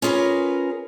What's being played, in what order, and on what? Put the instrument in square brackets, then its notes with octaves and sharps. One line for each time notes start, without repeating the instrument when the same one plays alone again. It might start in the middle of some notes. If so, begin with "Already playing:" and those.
[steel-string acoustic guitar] C#4 F4 G#4 A#4 B4